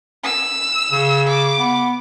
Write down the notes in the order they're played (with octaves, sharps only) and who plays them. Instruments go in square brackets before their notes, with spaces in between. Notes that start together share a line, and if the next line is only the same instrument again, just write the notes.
[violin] E6
[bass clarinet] C#3
[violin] D6
[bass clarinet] B3